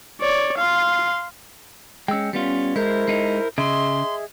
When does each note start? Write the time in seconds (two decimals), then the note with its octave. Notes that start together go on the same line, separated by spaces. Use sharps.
0.21 C#5 D5
0.58 F5 C6
2.08 G#3 C#4 G5 E6
2.33 G3 B3 C#4 F4
2.76 G#3 E4 A#4 C5
3.08 G#3 D#4
3.58 C#3 G#4 D#5 E5 C6